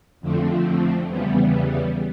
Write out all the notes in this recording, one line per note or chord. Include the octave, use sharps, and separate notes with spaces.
F2 D3 F3 A3 C4
E2 C#3 E3 G3 B3